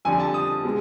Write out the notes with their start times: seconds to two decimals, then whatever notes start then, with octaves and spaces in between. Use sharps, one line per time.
0.05 F2 D3 G3 G#5
0.19 A5
0.34 D#6
0.65 B2 G#3